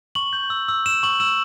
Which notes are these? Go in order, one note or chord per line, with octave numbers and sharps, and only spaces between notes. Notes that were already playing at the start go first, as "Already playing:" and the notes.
C#6 F#7
G6
E6
E6
E6 E7
C#6 F#7
E6 E7